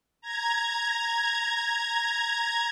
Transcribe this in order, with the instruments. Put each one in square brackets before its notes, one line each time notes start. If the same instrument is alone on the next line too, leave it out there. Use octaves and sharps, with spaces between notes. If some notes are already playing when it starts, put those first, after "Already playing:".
[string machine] A#5 G#6